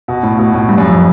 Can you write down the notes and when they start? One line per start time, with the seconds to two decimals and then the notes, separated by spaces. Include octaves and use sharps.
0.08 B2
0.23 A2
0.38 B2
0.54 A2
0.69 G2
0.78 F#2
0.86 F2